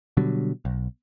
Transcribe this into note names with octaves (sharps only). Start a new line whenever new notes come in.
B2 D3 F#3 G3
B1